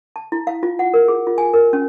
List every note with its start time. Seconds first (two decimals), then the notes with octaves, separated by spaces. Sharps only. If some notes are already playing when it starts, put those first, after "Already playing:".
0.16 A5
0.32 E4
0.47 F5
0.63 F4
0.79 F#5
0.94 A#4
1.08 G#4
1.27 F4
1.38 G#5
1.54 A#4
1.73 C#4